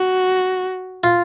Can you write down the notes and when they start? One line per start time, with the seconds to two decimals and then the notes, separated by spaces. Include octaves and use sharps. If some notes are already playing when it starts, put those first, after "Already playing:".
Already playing: F#4
1.04 F4